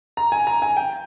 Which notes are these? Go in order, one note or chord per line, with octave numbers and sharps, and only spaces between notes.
A#5
G#5
A#5
G#5
G5